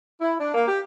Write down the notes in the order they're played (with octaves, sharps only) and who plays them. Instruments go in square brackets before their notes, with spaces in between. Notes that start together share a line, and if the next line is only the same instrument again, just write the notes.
[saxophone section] E4
D4
A#3
G4